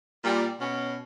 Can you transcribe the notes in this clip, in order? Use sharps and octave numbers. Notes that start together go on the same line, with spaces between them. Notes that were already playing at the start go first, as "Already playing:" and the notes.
A#2 G3
B2 C#4